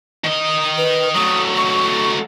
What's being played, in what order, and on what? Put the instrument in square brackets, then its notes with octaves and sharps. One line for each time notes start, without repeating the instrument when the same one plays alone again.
[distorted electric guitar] D#3 D#5
[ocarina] B4
[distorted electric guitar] F#3 A3 [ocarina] D#6
[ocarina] C#6